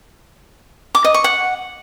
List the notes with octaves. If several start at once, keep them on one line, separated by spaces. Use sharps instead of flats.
D6
D#5
C#6
F#5